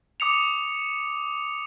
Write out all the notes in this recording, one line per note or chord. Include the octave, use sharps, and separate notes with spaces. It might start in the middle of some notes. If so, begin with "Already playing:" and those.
D6 D#6 C#7 F7